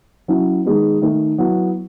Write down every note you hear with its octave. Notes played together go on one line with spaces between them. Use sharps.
F#3 C#4 E4
D#3 G#3 B3
D#3 A3 D#4
F#3 B3 E4